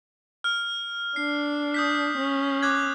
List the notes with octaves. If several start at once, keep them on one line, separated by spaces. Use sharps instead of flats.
F6
D4 C7
D#6 G6 B6
C#4
D6 F#6 G#6